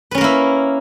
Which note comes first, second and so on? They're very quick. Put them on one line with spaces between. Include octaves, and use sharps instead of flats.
B4 C#4 A#4 A#3 E4